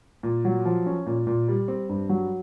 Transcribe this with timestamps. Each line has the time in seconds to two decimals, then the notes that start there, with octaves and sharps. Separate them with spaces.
0.23 A#2
0.45 F#3
0.65 F3
0.86 C#4
1.06 A#2
1.27 A#2
1.48 G3
1.68 C4
1.89 G2
2.09 F#3